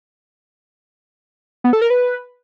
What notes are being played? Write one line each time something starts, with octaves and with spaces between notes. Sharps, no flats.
B3
A4
A#4
B4